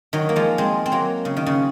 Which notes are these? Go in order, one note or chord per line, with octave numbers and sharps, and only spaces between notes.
D#3 F#3
A#3
F3 G#3
G#3 C4
C4
F#3 A#3
C#3
D#3
C#3